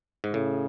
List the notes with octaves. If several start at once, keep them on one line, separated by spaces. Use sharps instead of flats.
G#2
A2 C#3